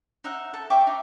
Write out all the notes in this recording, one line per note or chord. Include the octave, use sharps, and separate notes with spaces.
D#4 E5 F#5
A4 A5
E5 G5 C#6 D6
D#4